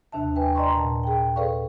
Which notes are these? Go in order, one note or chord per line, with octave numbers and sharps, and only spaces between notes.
D#2 C3 D4 E5 A5
B4 E5 G5 G#5
D5 D#5 A#5 C6 C#6
A#2 A5
G#4 G5
G#4 A4 B4 D5 F5 C#6